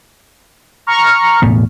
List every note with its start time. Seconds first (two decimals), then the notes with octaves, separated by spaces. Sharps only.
0.87 A#5 C#6 F6
1.42 E1 A2 B3